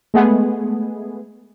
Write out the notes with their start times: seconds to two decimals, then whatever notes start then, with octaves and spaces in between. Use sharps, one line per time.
0.14 G#3 A3 B3 G#4